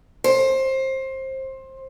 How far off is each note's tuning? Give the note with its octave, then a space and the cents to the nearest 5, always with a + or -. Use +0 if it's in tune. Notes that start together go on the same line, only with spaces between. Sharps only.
C5 +20